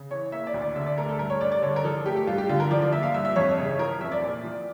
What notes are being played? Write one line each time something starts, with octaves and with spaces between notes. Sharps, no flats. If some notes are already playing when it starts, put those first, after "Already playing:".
Already playing: C#3
E3 C#5
A#3 E5
D5
D2
D5
D3 E5
D5
A3 A#4
A4
G2 A#4
C#5
G2 D5
D5
D3 C#5
A#4
F3 A4
A3 G4
G4
G2 F4
G4
D3 F4
A#4
F3 D5
D5
A#3 E5
F5
G2 E5
E5
F2 C#5
C#3
F3 A#4
F1 E5
D5
A#2
F3